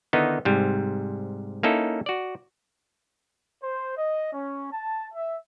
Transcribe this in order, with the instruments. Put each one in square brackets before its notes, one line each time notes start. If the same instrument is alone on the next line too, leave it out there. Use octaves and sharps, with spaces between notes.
[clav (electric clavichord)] D3 D#3 B3 D#4 E4
G#2 C3 G3
A#3 C#4 D#4 E4 A4
F#4 D5
[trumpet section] C5
D#5
C#4
A5
E5